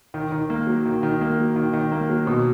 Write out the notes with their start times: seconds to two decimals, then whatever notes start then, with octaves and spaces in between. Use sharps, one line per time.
0.14 D#3
0.32 D#3
0.50 A#3
0.67 F#3
0.86 D#3
1.03 D#3
1.21 A#3
1.38 F#3
1.56 D#3
1.73 D#3
1.92 A#3
2.09 F#3
2.27 B2